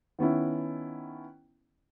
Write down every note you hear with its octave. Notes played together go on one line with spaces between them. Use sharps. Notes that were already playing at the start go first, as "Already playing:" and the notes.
D#3 B3 C#4 E4